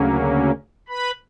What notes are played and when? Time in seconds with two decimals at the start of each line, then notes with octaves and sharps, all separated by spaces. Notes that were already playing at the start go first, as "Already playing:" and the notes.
Already playing: D2 C#3 F#3 A#3 C#4
0.89 B4 B5